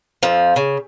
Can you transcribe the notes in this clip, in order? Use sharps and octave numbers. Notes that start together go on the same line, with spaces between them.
F2 F3
C#3